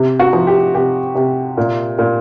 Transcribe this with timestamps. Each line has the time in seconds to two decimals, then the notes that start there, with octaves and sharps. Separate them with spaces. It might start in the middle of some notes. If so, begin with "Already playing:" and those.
Already playing: C3
0.19 F#4
0.33 F3
0.47 G4
0.75 C3 G4
1.15 C3
1.57 A#2
1.99 A#2